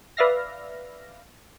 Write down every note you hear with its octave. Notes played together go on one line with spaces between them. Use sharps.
B4 D5 E5 F5 F6 A#6